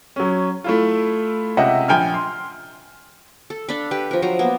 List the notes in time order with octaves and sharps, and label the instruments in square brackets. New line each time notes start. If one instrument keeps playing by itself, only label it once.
[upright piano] F#3 C#4
A3 E4 F4
C#2 C3 D#5 E5 F#5
A#1 G5 G#5 F6
C6
[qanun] A4
D4 A4 F5 B5
G4 B4
F3 A#4
F3 F#3 C5 A#5
A#3 B3